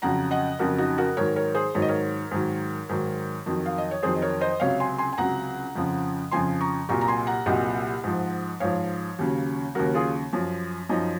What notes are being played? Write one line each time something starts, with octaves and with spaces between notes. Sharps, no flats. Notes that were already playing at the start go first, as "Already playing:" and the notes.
F2 C#3 F#3 F#5 A#5
D#5 F#5
F2 C#3 F#3 F#4 A#4
D#4 F#4
F#4 A#4
G#2 D#3 F#3 A#4 C#5
A#4 C#5
G#4 C5
G#2 D#3 F#3 C#5
D#5
A#4 C#5
G#2 D#3 F#3
G#2 D#3 F#3
F2 D#3 F#3
F5
D#5
C#5
F2 D#3 F#3 G#4 C5
D#5
A#4 C#5
C5 D#5
C#2 C3 F#3 C#5 F5
G#5 C6
G#5 C6
G#5
C#2 C3 F#3 F#5 A#5
F2 C#3 F3
F2 C#3 F3 G#5 C6
A#5 C#6
C2 A#2 F#3 A#5 C#6
A#5
G#5 C6
F#5 A#5
C2 A#2 F#3 D#5 F#5
G#2 F3
G#2 F3 C#5 F5
D#2 C#3 F#3
D#2 C#3 F#3 F#4 A#4
F4 G#4
F#2 F3
F#2 F3 D#4